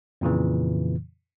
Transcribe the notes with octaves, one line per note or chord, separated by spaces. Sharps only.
F2 A#2 C#3 E3